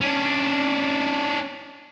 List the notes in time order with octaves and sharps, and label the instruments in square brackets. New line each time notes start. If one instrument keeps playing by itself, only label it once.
[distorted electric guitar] C#4 D4